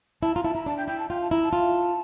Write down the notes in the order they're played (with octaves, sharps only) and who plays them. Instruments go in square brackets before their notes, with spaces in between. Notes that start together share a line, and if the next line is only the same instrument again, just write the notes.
[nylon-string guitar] E4 [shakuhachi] A5
[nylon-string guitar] F4 [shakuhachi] A#5
[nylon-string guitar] E4 [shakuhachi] A5
[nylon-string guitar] E4 [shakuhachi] A#5
[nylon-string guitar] D4 [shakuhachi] A5
[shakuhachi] G5
[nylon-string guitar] E4 [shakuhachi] G5
[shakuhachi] A5
[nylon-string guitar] F4 [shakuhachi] G5
[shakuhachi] A5
[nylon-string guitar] E4 [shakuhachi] A#5
[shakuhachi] A5
[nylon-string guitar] F4